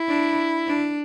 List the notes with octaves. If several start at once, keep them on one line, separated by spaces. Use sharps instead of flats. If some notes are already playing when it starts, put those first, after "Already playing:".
Already playing: E4
D4
D4